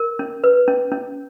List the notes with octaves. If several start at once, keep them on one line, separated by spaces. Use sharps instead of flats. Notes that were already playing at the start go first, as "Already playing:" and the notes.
Already playing: A#4
C#4
B4
C#4
C#4